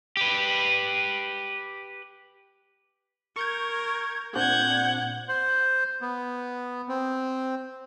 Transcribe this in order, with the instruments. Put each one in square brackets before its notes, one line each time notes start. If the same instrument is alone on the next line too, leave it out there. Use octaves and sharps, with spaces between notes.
[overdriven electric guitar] G4 B4
[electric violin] A#4 [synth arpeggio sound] C#6 G6 G#6
[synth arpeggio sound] A#2 C4 D4 [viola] F#5 [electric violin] G6 G#6
[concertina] C5
B3
C4